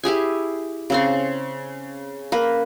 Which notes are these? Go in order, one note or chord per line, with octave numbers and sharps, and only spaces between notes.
E4 G4 G#4 G#5
C#3 C4 C6
A#3 B4